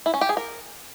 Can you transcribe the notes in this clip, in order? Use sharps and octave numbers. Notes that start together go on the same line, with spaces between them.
E4
C#4
G4
G#4
A#4